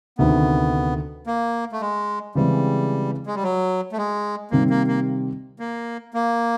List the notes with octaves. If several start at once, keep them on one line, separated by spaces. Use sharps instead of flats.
D2 C3 D#3 B3
A#3
A3
G#3
C#3 E3 G3 G#3 C4
G#3
G3
F#3
A3
G#3
C3 D#3 G3 A#3 C4
A#3
A#3
A#3
A#3